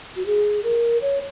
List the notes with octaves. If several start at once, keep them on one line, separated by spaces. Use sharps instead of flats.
F#4
G#4
A#4
C#5